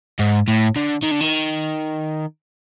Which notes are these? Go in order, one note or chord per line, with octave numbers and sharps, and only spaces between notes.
G#2
A2
D3
D#3
D3
D#3